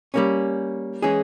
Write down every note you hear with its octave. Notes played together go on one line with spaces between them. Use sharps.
G3 A#3 C#4
E3 G#3 C#4 G#4